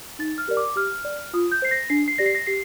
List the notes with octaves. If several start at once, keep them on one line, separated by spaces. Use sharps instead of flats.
D#4 A6
F6
G4 A#4 D5
D6
G4 F6
D5
F4 D#6
G6
C5 C7
A#6
D4 C7
C7
G4 D5 A#6
C7
A#6
G4 C7